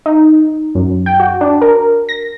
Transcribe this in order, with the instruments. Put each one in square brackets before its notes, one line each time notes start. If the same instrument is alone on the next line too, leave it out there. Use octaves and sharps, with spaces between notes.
[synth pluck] D#4
F#2
G5
F#4
D4
A#4
A#6